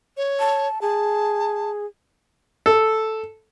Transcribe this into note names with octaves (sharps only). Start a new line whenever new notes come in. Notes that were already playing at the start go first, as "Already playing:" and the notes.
C#5
A5
G#4 A5
A4